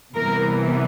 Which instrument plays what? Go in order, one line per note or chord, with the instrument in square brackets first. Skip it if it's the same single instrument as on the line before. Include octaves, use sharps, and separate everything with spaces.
[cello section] C3 E3 G3 B3 A#4